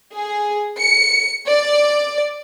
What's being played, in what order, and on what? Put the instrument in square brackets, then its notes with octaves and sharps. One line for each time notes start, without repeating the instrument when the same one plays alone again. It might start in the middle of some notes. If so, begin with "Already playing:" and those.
[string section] G#4
C#7
D5